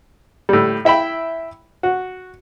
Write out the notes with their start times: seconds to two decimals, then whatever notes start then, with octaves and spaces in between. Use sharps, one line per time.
0.49 A2 G3
0.85 E4 E5 G5 B5
1.83 F#4